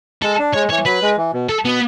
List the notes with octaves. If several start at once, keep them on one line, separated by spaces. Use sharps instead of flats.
G#3 A4
D4
G#3 C#5
E3 C#5
F#3 B4
G#3
E3
B2
A4
B2 B3